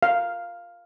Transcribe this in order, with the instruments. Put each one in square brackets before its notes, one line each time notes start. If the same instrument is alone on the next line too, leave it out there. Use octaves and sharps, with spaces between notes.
[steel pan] F5